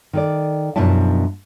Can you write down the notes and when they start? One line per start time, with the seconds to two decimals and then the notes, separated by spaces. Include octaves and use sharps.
0.13 D#3 A4 D5
0.76 F#2 B2 F3 D4 E4 A5